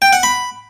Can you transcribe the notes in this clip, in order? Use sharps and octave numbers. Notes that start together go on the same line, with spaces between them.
G5
F#5
B5